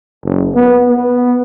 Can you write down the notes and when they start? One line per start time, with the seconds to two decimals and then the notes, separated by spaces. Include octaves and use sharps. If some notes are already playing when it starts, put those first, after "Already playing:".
0.24 F#1
0.55 B3
0.89 B3